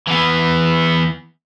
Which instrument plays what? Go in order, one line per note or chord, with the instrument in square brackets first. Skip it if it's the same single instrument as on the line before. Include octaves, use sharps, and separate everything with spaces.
[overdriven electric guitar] E3 B3